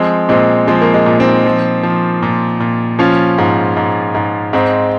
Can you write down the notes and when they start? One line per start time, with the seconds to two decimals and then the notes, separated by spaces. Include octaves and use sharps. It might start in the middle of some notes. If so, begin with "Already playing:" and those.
Already playing: F3 G#3 C4
0.29 A#2 G#3 C4
0.67 F3 G#3 C4
0.81 A#3
0.94 G#3
1.06 A#2
1.19 C4 D#4
1.45 F3
1.83 F3
2.23 A#2
2.60 A#2
2.99 F3 C#4 F4
3.38 G#2
3.77 G#2
4.15 G#2
4.53 G#2 C4 D#4